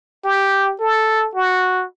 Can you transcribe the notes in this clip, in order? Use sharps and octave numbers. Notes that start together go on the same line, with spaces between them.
G4
A4
F#4